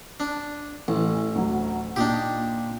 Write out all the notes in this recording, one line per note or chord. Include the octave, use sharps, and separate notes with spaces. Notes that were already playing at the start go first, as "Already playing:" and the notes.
D4
A1 E3
D2 F#3
A#2 D4 D#4 G4